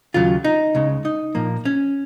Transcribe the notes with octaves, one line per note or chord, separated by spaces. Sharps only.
D#2 C#3 F#3 F4
D#4
C#2 C#3 G#3
D#4
A#2 F3 A#3
C#4